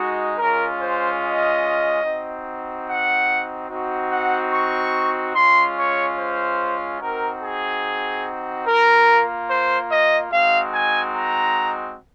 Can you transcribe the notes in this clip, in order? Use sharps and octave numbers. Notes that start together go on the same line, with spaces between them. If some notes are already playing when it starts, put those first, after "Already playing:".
Already playing: G#3 D#4 F#4
G#3 C#4 F4 A#4
C5
D#5
C4 D#4 F#4
F#5
C4 D#4 F#4
F#5
C#6
G#3 C#4 F4 C6
C#5
C5
C4 D#4 F#4 A#4
G#4
A#3 F4 A#4
C5
D#5
G#3 C4 D#4 F#4 F5
G#5
A#5